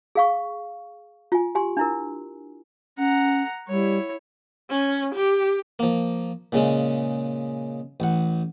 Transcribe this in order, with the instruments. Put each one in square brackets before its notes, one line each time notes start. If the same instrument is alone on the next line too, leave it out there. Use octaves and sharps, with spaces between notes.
[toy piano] G#4 F5 C#6
F4 G#5
G4 G#5 C6
D4 E4 A#4
[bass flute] C#4 [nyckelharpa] F#5 A#5
[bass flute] G3 [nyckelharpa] E4 C#5
[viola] C#4
G4
[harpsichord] F3 A#3
A#2 C#3 G#3 C#4
A1 F#5